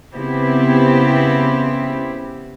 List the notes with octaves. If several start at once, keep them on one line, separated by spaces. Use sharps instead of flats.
C#3 B3 C4 E4 G4